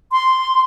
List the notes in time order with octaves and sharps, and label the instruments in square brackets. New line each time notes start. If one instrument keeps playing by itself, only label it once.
[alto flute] C6